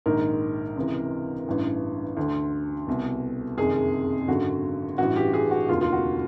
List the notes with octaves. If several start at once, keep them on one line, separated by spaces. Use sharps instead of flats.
A#1 G#2 D#3 A#4
C#2 C3 E3
A1 G2 E3
D2 D3
C2 B2
F#1 F2 C3 D#3 G#4
G#1 F#2 D3 F#4
A1 G2 E3 F#4
G4
G#4
F#4
F1 D#2 D3 F4
F4
F#4